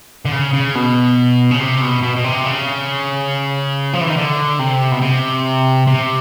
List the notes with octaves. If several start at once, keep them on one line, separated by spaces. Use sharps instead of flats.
D3
C#3
C#3
B2
C#3
C3
B2
B2
B2
C3
C#3
F3
E3
D#3
D3
C3
B2
C3
C3